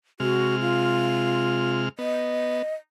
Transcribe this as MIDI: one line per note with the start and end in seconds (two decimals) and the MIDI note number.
0.20 1.89 48
0.20 1.89 56
0.20 0.59 66
0.20 1.89 89
0.60 1.82 65
1.99 2.62 59
1.99 2.74 75